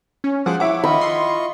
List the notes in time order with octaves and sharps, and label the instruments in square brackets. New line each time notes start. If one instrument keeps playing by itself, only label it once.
[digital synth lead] C#4
[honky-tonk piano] F3 G#4 [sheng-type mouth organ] C5 D6 [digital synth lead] F#5
[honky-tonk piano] E4 E5 F#5 [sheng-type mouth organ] C#5 [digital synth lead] D6
[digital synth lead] D#3 [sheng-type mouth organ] F4 D#5 C#6 [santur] B5
[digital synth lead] C6